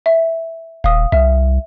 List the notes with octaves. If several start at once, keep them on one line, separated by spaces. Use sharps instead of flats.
E5
D#1 F5 D#6
C2 E5